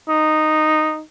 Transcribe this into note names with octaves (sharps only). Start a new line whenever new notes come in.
D#4